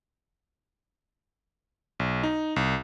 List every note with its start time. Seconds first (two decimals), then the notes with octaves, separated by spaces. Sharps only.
2.00 B1
2.23 D#4
2.56 C2